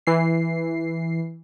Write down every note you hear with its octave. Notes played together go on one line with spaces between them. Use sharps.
E3 C7